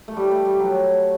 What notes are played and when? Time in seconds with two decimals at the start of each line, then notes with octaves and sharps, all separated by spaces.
0.08 A3
0.16 G3
0.31 A3
0.45 G3
0.59 F#3